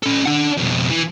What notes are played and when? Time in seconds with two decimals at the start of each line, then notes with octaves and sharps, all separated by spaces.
0.03 C#4 A4
0.26 D4 F#5
0.57 F2 B2
0.90 E3